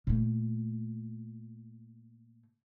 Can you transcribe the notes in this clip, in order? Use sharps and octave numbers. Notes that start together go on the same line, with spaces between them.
A#2 A3